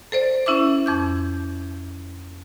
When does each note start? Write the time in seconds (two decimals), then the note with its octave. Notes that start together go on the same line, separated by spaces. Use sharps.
0.12 A4 C5 D5
0.46 C#4 E4 E5 D6
0.86 F2 D6 G6